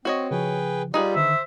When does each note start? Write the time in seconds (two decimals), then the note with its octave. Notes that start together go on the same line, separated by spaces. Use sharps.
0.05 C4 F#4 C#5 D#5
0.31 C#3 F3 G#4 B4 G5
0.94 G3 D#4 F4 G4 G#4 B4
1.15 D3 D#3 C5 E5